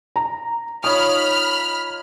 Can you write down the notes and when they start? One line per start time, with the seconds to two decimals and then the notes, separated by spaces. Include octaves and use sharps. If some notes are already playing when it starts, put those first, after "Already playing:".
0.16 A#5
0.84 D#4 F4 C#5 B5 D#6 F6